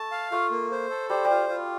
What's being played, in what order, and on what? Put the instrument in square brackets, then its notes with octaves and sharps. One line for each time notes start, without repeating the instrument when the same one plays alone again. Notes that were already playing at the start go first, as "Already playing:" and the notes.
Already playing: [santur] A3 [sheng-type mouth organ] A5
[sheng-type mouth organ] F5
[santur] A3 [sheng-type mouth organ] F4
[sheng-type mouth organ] A#3
C5
A4
[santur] G3 [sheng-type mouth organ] C5
[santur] G3
[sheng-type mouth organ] F4
F4